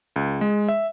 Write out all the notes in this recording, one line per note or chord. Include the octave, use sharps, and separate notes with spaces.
C#2
G#3
E5